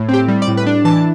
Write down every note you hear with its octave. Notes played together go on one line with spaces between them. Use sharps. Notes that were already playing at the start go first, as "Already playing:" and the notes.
Already playing: A2
C4 G4
G3
D5
A2
B4
D4
E3 A5